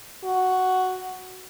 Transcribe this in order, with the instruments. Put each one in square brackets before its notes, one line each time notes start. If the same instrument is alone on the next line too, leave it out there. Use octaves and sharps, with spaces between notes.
[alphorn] F#4